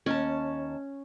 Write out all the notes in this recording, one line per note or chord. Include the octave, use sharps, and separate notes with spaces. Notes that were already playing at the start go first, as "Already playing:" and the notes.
D#2 C#4 G#5 A5